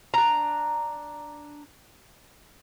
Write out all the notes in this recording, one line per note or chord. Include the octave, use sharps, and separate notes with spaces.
D4 A#5